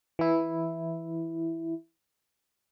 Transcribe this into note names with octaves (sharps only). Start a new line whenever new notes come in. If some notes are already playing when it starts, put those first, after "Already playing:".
E3 E4